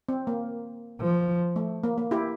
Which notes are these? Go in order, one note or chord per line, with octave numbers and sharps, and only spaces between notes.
C4
A#3
F3
A3
A#3
A#3
E4 G4